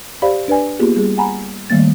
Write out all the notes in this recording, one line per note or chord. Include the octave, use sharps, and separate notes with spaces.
G4 C5 D5 F5 B5
D4 B4 D5 G#5
A#3 B3 F4 G4 G#4
G3 G#4
F#5 G#5 A#5 B5
D#3 G3 A3 A#3 A6